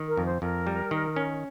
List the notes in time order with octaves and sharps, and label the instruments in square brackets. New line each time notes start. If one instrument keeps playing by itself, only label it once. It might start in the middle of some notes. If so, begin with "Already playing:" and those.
Already playing: [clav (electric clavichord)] D#3
[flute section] A#4
[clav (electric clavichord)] F2
[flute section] C5
[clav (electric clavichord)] F2 [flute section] A#4
[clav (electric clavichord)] G3
D#3
C#4